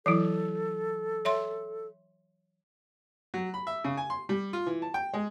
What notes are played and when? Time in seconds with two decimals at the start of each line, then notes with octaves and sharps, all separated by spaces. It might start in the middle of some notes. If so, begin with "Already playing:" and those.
0.06 E3 F#3 E4 A4
1.25 C#5 E5 C6
3.34 F#3
3.54 B5
3.67 E5
3.84 C#3
3.97 G#5
4.10 C6
4.29 G3
4.53 F4
4.66 E3
4.82 A5
4.94 G5
5.14 G#3